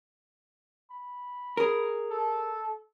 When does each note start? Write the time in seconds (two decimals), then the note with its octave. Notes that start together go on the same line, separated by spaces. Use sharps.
0.91 B5
1.57 G#4 A#4
2.11 A4